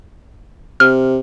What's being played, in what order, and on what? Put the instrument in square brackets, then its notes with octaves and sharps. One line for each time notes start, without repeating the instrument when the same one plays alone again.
[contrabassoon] C3 [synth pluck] F6